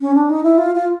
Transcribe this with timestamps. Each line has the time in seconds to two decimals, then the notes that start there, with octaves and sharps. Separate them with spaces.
0.01 C#4
0.15 D4
0.30 D#4
0.44 E4
0.58 F4
0.75 F4